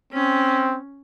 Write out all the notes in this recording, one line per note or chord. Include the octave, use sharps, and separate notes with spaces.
C4 C#4